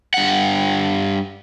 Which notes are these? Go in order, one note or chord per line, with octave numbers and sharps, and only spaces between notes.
G2 F#5